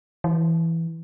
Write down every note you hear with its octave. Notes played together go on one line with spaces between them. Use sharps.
E3